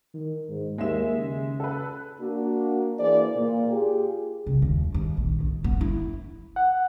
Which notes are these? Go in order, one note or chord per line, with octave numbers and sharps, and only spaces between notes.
D#3
G#2
D#2 G#3 E5 E7
C#3
A4 B4
A#3 D4 F#4
E3 A#3 G#4 C5 D5
A#2
F4 G4 G#4
C#2
D#2
D#2
A#1
D#3
B3
E4
F#5